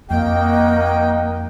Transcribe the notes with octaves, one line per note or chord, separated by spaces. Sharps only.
F2 A#3 D#4 F#4 D#5 G5